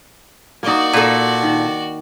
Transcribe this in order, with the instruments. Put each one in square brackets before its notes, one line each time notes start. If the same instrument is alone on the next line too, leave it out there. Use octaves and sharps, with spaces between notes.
[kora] A#3 D#4 [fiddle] F#4 D5
[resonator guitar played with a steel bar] A#2 A4
[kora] D#3